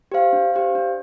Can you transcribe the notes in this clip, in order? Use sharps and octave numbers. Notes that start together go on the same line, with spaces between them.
G4 C5 F5
D4
G4 C5 F5
D4